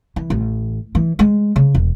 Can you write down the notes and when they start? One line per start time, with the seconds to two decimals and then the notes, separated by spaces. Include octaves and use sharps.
0.16 E3
0.30 A1
0.95 E3
1.19 G#3
1.56 C#3
1.75 E1